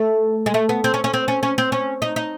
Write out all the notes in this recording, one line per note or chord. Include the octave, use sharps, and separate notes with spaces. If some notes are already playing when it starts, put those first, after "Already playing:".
Already playing: A3
G#3
A3
B3
C4
C#4
C#4
C4
C#4
C#4
C4
C#4
D#4
D#4